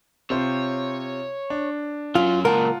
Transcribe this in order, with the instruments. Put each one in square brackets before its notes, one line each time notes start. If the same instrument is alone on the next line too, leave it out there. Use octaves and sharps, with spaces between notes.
[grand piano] C3 F4 C5 [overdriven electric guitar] C#5
[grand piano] D4
[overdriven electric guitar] F#3 C#4 [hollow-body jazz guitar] F4
[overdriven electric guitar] C#2 A#2 [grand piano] F4 F#5 A5 [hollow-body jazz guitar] A#4